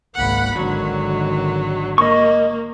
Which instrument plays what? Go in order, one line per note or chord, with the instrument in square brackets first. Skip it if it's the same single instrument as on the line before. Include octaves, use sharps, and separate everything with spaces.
[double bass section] G#1 C#2 A#3 [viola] F#5 B5
[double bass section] G#1 D3 D#3 [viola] F#3
[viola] A#3 [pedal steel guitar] D#5 C#6